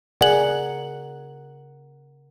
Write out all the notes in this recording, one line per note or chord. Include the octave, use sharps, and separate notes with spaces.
C#3 G#4 A#4 D5 F#5 G#5 F#7